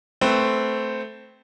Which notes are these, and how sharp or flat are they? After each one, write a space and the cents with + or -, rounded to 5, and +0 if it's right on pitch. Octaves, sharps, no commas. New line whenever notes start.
A3 +0 C4 -10 B4 +0